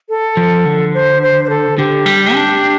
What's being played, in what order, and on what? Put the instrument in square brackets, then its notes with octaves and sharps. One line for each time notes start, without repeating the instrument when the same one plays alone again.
[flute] A4
[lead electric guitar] F3
D3
[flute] C5
C5
C5
A4
[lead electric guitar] D3 [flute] G4
[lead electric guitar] G3
D4